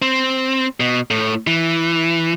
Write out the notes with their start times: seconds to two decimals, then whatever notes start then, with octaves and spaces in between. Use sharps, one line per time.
0.02 C4
0.80 B2
1.11 A2
1.47 E3